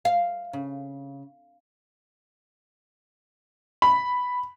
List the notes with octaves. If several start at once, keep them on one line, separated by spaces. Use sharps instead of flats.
F5
C#3
B5